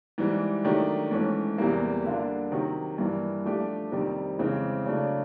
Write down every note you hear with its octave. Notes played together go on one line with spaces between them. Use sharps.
G#2 E3 G3
D#3 F#3 A3 D4 G4
G#2 E3 A3 C#4
E2 C3 E3 G3 A#3
D3 G3 A#3 D4 F4
C3 D#3 F#3
G2 E3 G3 A#3
F3 A3 D4 G4
F2 C3 D#3 G3
F2 C#3 E3 G#3 C4
C#3 F#3 A3 D4